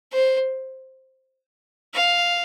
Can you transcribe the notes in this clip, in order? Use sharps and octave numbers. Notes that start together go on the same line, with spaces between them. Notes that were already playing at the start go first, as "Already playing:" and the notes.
C5
F5